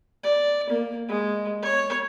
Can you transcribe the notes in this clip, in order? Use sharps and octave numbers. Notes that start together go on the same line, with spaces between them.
D5
A#3
G#3
C#5